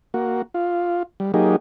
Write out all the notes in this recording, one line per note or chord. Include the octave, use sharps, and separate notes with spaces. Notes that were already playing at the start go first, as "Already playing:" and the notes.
A#3 F#4
F4
G3
F#3 A#3 D#4 G4 G#4